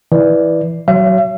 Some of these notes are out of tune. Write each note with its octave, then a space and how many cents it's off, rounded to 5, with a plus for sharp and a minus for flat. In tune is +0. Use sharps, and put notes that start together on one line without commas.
E3 -10 D5 +0
F#3 +25 C#5 +0 E5 +45